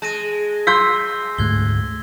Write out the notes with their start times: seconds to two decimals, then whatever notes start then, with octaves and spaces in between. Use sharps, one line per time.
0.02 G#3 A5 A#6 D#7
0.67 C6 E6 G6 B6
1.38 D2 G#2 A3 F#6 G#6 G7